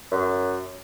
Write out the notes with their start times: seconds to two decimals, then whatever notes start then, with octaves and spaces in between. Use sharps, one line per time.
0.12 F#2